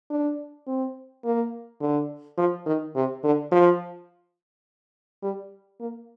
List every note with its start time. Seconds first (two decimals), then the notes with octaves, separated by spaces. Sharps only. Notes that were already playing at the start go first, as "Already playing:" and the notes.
0.10 D4
0.67 C4
1.25 A#3
1.81 D3
2.38 F3
2.66 D#3
2.96 C3
3.24 D3
3.52 F3
5.23 G3
5.80 A#3